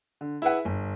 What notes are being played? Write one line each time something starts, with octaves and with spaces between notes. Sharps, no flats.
D3
E4 G#4 B4 F#5
G1